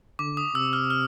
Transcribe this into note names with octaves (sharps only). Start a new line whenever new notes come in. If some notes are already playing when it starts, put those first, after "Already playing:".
D3 D6
D#6
C3 E6
F6
F6